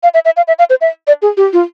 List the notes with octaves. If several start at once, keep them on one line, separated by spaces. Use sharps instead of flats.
F5
E5
E5
F5
E5
F5
C5
E5
D5
G#4
G4
F4